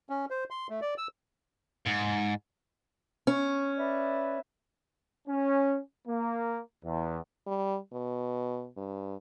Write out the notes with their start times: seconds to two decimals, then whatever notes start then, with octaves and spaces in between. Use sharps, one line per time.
0.09 C#4
0.31 C5
0.50 C6
0.70 A3
0.81 D5
0.98 E6
1.87 G#2
3.27 C#4 C#6
3.75 B4 D5 E5
5.28 C#4
6.07 A#3
6.84 E2
7.47 G3
7.93 B2
8.77 G2